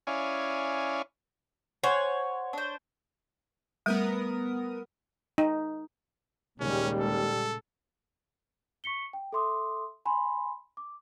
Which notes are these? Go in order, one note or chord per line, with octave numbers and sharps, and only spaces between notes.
C#4 E4 C#5 D5 F5 G#5
C5 C#5 F#5 G#5
D4 C5
G3 A3 B3 A#4 D#6
D#4
D#2 A#2 C#3 G3 G#3 C#4
A4
C#6 B6 C#7 G7
G5
A4 E5 C6 D6 D#6
G#5 B5 C6
D6